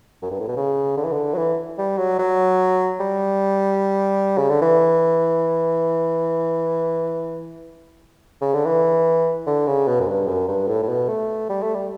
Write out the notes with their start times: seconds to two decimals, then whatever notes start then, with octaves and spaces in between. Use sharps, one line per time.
0.23 F#2
0.31 G2
0.40 A2
0.48 B2
0.57 C#3
0.97 D3
1.04 E3
1.12 D3
1.34 F#3
1.38 E3
1.78 G3
1.98 F#3
2.19 F#3
3.00 G3
4.38 C#3
4.49 D3
4.62 E3
8.42 C#3
8.54 D3
8.66 E3
9.47 D3
9.67 C#3
9.88 B2
10.00 F#2
10.07 G2
10.28 F#2
10.48 G2
10.68 A2
10.83 A2
10.89 B2
11.08 A3
11.49 G3
11.62 A3
11.75 G3